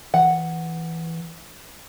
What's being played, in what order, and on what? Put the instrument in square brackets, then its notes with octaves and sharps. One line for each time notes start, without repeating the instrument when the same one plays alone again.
[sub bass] E3 [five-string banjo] F#5